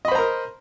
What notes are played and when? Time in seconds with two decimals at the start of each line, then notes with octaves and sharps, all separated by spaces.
0.05 D#5
0.08 B5
0.12 C5
0.15 A#5
0.18 A#4